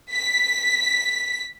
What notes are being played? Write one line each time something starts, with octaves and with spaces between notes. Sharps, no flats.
B6